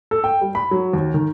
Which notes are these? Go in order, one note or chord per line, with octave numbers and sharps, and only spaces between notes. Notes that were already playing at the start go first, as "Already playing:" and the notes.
A4
G5
G3
B5
F#3
D#2
D#3